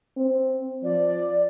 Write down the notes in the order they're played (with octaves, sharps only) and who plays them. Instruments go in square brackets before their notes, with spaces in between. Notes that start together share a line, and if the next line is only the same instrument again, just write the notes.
[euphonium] C4
[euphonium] F3 [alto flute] D5